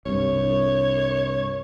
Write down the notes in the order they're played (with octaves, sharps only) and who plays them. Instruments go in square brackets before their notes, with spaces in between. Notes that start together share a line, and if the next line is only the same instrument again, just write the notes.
[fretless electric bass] C2 G2 [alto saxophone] C#5